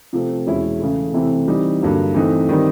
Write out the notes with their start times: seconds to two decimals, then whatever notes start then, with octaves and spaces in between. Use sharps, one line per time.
0.13 C3 F3 A3 C4
0.46 E2 B2 G#3 C#4 E4
0.80 C#3 E3 A3
1.13 C3 E3 A3 C4 E4
1.47 E3 G3 C4 D#4
1.81 G2 D3 F#3 A#3
2.15 E3 A3 C4 D#4
2.49 D#3 G3 C4 D#4